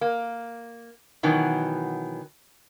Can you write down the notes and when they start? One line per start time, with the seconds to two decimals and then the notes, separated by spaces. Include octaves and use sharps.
0.01 A#3
1.23 B2 D#3 E3 F#3